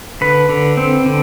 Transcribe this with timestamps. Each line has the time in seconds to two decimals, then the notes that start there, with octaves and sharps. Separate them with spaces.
0.21 D3 B4
0.49 D3
0.77 C4
1.06 D3